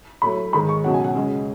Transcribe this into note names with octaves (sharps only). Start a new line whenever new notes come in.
A2 F#3 A3 B5
G#2 D#3 G#3 B5
C#6
C#2 B2 F#3 F#5
G#5
F#5
C#2 C#3 G#3